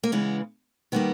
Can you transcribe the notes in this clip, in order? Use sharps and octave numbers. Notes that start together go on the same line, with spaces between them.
A#3
C#3 E3 G#3 B3
D#3 G3 A#3 B3